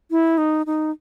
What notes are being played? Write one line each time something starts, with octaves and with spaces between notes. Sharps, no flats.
E4
D#4
D#4